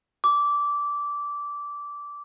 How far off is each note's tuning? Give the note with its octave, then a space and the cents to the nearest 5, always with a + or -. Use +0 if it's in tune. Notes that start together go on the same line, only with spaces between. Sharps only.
D6 -15